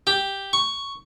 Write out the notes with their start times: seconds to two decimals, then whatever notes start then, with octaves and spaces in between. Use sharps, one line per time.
0.07 G4
0.53 C#6